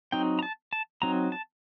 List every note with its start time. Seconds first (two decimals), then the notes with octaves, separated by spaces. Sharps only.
0.12 F#3 C4 D#4 G5
0.39 A#5
0.43 A5
0.73 A5
1.02 F#3 C4 D#4 A#5
1.32 A5